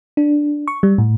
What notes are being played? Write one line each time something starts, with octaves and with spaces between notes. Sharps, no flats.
D4
C#6
G3
A2